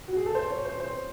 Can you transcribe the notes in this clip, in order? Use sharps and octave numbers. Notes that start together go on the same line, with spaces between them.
F#4
G#4
A4
C5
C#5
C5
C5